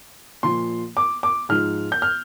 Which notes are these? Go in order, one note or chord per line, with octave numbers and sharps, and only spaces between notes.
A#2 F3 C6
D6
D6
G#2 F3 F6
G6
F6